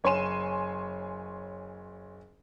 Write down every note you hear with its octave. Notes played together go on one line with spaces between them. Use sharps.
F#1 C#5 G#5 C6 D#7 E7